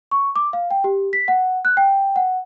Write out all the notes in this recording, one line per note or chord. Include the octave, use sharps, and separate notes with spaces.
C#6
D6
F5
G5
G4
B6
F#5
F#6
G5
F#5